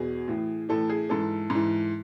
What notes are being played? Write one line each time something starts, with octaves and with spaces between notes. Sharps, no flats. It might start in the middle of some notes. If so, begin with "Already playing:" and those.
Already playing: E2 B2 G#4
A2 E3
A2 E3 A4
G#4
G#2 E3 A4
G#2 E3